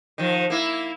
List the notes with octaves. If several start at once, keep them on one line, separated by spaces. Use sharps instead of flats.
D#3 F3
A#3 E4